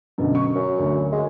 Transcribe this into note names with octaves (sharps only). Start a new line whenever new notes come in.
F#2 B2 D3
C#6
F#2
D2
G#3